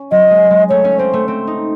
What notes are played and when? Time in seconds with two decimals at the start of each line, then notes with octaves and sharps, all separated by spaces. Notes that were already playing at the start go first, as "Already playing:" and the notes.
Already playing: C#4
0.11 F#3 D#5
0.31 G#3
0.51 G#3
0.69 A3 C#5
0.84 C#4
0.99 C4 C5
1.13 A3
1.28 C4
1.47 D#4